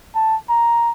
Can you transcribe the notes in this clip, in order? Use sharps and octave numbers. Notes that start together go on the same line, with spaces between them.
A5
A#5